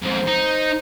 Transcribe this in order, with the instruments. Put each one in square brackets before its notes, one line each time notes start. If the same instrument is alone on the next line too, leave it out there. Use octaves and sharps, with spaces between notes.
[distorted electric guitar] F2 G#2 [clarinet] C5
[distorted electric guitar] D#4